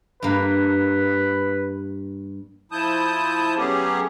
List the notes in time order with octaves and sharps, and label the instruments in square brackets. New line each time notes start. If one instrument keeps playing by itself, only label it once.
[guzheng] G2 A#3 [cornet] B4
[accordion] F3 E4 A5 D#6 G6
F#3 A3 B3 C#4 G4 G#4